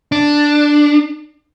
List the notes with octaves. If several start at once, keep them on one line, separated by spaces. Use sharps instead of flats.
D4